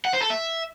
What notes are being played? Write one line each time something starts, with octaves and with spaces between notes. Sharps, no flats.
F#5
C5
A4
E5